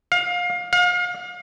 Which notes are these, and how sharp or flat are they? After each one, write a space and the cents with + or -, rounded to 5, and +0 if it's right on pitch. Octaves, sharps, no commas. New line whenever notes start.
F5 +25
F5 +35